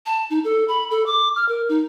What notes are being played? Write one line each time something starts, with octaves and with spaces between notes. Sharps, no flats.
A5
D#4
A4
B5
A4
D6
F6
A#4
D#4